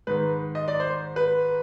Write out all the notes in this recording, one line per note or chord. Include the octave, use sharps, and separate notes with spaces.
G#2 D#3 B4
D#5
D5
C5
B4